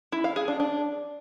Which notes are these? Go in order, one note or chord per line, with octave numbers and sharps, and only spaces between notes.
E4
F5
G#4
D4
D4